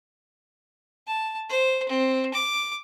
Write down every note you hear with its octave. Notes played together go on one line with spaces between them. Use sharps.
A5
C5
C4
D6